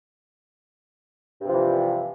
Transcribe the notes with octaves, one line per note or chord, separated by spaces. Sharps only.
G2 C3 E3 F3